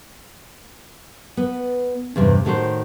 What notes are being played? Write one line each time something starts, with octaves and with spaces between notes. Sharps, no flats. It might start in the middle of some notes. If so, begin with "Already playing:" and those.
B3
E2 G2 C3
A2 D#3 F#4 C5